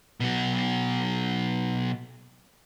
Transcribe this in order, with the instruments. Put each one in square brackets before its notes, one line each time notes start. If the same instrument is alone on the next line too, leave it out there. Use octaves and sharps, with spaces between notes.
[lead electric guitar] B2 F#3